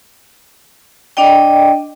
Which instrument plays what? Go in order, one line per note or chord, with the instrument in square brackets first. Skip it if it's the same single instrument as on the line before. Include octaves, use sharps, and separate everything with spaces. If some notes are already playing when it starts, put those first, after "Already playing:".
[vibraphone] D4 D5 D#5 G5